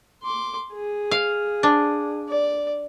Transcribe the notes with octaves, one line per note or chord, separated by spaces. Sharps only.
C6 D6
G#4
F5
D4
D5